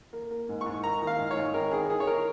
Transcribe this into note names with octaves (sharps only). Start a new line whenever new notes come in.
A#3
A#3
G#2
C#6
G#2
A#3 A#5
D#3
F5
G#2
C#5
G#2
G#1 A#4
G#1 G#4
D#3 G#4
C#5
A#4